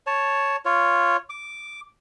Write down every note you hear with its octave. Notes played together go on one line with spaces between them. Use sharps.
C#5 A5
F4 C#5
D6